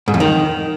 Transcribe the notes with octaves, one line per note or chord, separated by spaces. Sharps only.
G#2
F2
D#3